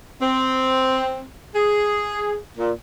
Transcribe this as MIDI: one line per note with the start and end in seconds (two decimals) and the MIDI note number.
0.20 1.23 60
1.55 2.38 68
2.58 2.72 46